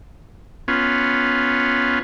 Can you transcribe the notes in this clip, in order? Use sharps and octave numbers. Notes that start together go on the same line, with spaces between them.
B3 C#4 F4